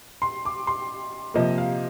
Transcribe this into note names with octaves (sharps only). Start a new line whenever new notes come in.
C6
D6
C6
C3 F3 A#3 D#5
F5